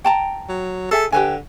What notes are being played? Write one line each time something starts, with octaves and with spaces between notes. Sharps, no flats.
G5 A5 A#5
F#3
G#4 A4 E5 G#5
D3 G4 B4 G#5